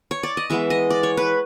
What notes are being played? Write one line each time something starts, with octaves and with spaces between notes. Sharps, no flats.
C#5
D5
D#5
E3 G#3 B3 E5
D#5
D5
C#5
B4